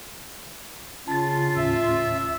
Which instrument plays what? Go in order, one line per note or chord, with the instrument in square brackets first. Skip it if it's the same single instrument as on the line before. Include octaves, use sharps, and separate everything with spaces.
[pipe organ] C#3 [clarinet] F4 [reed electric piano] A5 A6
[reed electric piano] D#2 A2 C#4 [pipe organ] E5